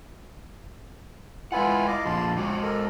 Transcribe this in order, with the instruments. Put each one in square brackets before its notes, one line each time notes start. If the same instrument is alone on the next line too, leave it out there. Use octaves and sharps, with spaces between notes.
[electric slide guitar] G#3 B4 F#5 [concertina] E4 F4 G#5
[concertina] D#5 F5 D6
[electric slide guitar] F2 A#2 F3 [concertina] A5 C6
[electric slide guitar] G#3 F#4 [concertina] D6
[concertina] A4 A#4